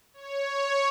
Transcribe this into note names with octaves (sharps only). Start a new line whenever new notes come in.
C#5